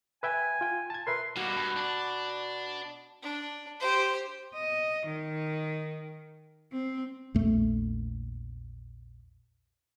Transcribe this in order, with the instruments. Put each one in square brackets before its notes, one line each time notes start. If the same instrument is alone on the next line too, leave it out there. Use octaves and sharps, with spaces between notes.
[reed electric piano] B4 E5 G5 [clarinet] G#5
[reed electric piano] F4 G5
A5 G#6
[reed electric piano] A#4 B4 E5 [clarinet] C6
[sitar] B2 F#4 [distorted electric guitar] G3 A#3
[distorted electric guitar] G2
D4 D5
[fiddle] D4
G4 C5
[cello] D#5
D#3
C4
[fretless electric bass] A#1 E2 A3